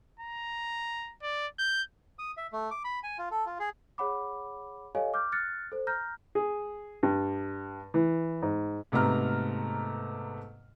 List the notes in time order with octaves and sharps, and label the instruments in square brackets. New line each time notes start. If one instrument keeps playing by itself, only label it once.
[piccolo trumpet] A#5
D5
G6
[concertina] D#6
E5
A3
D6
B5
G#5
F4
A4
F4
G#4
[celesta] G#4 C#5 F#5 B5 D6
G4 A4 C#5 D#5 F5 G#5
D6 F6 G6
F6 F#6 A6 C#7
A4 C5
A#5 F6 G6 A#6
[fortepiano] G#4
G2
E3
G#2
[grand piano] G#2 C3 A3 B3 A#5 F6